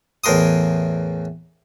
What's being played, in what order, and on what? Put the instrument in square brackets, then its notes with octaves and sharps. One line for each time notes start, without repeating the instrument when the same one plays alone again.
[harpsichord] E2 A2 A#4 C6 D#6